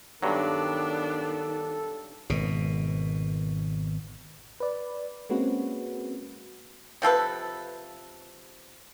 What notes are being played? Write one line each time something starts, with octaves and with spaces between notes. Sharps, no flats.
G2 D#3 F#3 B3 D4 A4
G#1 B2
B4 D5
G#3 A#3 C4 C#4 F#4 B4
C3 F3 A4 B4